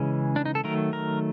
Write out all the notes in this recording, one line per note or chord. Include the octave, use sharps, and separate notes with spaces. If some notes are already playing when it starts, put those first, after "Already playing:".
Already playing: C#3 E3 G#3 C#4
D4
D#4
A4
D#3 F#3 A3 A#4
A#4